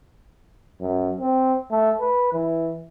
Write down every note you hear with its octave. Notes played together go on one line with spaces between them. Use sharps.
F#2
C4
A3
B4
E3